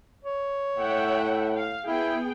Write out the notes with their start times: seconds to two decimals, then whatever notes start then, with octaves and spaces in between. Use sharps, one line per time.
0.25 C#5
0.79 A2 E5 F#5 G5
1.55 F5
1.86 B3 E4 G#4 G5